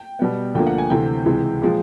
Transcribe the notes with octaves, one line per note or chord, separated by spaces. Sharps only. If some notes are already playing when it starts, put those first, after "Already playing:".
Already playing: G5
B2 G3 B3
D2 D3 F3 A#3 G5
F#5
G#5
D2 C3 E3 A3 C4 G5
C#2 C3 E3 G#3
A#2 F3 G#3